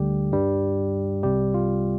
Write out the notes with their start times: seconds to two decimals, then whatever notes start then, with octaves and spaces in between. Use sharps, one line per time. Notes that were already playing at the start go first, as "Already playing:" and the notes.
Already playing: D2 D3 G3 G4
0.32 G2 G3
1.23 C2 C3 G3 G4
1.54 F4